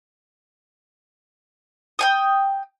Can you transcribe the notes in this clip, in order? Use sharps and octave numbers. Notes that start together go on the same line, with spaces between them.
G5 G#5 D#6